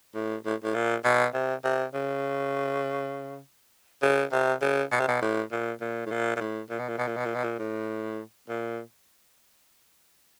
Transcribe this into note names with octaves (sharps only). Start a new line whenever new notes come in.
A2
A2
A2
A#2
B2
C3
C3
C#3
C#3
C3
C#3
B2
C3
B2
A2
A#2
A#2
A2
A#2
A#2
A2
A#2
B2
A#2
B2
A#2
B2
A#2
B2
A#2
A2
A#2